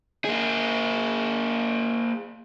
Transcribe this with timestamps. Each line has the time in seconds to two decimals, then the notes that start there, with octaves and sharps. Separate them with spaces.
0.25 A#3 G#4